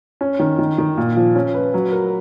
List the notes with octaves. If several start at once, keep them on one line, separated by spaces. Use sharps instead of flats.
C#4
D#3
D#3
D#3
A#2
F3
C#4
B4
F#3
A#4